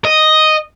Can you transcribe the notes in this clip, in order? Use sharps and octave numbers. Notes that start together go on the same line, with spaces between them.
D#5